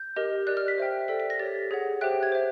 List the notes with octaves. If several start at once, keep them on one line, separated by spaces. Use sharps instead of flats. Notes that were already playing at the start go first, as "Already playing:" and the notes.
Already playing: G6
G4 A#4 D#5
G4 A#4 D5 F#6
F6
B6
C5 E5 G5
A4 D5 G5 B6
B6
A#6
G4 A#4 C#5 A6
G#4 C#5 F#5
G4 C5 E5 G5 F#6
G#6
C5 E5